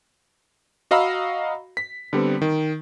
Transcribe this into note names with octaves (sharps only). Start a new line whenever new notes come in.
F#4 D#5 F5 A#5 B5 E6
B6
D3 G3 B3 C4
D#3